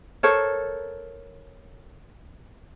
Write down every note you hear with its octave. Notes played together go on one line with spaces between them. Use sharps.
A4 A#4 C5 C#5